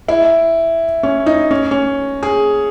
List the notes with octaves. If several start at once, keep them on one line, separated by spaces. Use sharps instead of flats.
E4
C#4
D#4
C#4
C#4
G#4